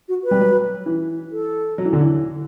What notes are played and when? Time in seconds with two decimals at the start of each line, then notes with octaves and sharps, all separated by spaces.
0.08 F#4
0.24 B4
0.31 G3
0.39 F#3
0.86 E3
1.32 A4
1.78 F#3
1.85 E3
1.93 D3
2.00 E3